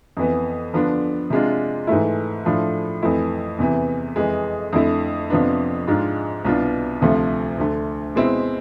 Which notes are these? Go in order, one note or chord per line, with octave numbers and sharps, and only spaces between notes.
F2 E3 B3
D3 F3 B3 D4
C3 G#3 D4 F4
G#2 E3 A3 E4
A2 F3 A3 D4
F2 E3 A3 E4
E2 C3 E3
F2 E3 G#3
F2 D3 A3 E4
F2 C3 F3 B3 D4
G#2 G#3 D4 F4
C2 B2 B3 D4 F4
D2 C3 F3 A3
D2 D3 A3
B2 G#3 C4 E4